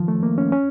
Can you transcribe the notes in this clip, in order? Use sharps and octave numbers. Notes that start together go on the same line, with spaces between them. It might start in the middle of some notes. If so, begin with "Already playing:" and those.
Already playing: D#3 F3
A3
A#3
C#4
C#4